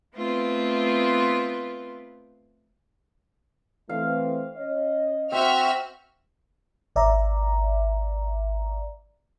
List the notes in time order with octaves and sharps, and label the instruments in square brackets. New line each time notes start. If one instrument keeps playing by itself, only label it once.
[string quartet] A3 B3 C4 F4 B4
[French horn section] E3 A3 C4 [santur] F5
[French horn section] C#4 C#5 D#5
[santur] C4 [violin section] F#4 E5 F6
[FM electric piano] G#1 D5 E5 A#5